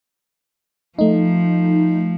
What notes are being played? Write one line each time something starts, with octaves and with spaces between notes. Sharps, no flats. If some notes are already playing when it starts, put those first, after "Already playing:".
F3 A3 D#4